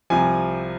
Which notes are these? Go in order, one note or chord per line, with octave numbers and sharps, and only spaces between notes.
C2 C3 F3 G#5